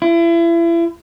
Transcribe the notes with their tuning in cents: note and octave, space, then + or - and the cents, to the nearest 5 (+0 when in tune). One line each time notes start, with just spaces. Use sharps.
E4 +35